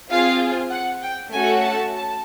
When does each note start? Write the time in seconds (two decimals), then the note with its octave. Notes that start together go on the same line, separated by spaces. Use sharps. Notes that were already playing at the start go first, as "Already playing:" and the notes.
0.11 C4 F4 G#4 F5
0.71 F#5
1.02 G5
1.33 A3 C#4 F#4 A4 G#5
1.64 A5
1.94 A5